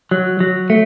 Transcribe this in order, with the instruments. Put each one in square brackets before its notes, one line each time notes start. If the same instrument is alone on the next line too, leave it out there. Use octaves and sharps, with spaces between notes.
[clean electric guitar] F#3
F#3
A3